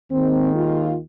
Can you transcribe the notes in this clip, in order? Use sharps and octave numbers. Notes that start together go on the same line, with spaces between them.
D#2 D#3 G#3 C4
F4